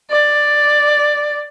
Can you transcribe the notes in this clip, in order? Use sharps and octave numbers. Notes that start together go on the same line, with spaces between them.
D5